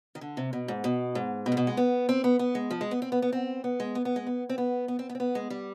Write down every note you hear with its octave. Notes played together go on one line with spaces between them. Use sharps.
D#3
D3
C3
B2
G#2
B2
G#2
B2
G#2
B2
G#3
B3
C4
B3
B3
G#3
F3
G#3
B3
C4
B3
B3
C4
B3
G#3
B3
B3
G#3
B3
C4
B3
B3
C4
B3
C4
B3
G#3
G3